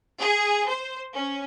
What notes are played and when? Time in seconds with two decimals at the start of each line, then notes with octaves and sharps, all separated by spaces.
0.19 G#4
0.68 C5
1.13 C#4